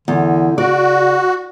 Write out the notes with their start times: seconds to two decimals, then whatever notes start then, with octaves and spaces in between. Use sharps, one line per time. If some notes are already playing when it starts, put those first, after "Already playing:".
0.08 E2 D3
0.58 C#3 F#4 D5